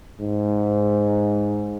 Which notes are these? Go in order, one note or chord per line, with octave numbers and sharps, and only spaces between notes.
G#2